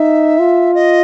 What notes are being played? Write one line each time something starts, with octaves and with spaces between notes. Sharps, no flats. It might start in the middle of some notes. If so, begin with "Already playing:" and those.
Already playing: D#4 E5
F4
D#5